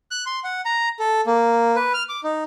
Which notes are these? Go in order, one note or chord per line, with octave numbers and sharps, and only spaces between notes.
F#6
C6
F#5
A#5
A4
A#3
B4
F6
D6
D#4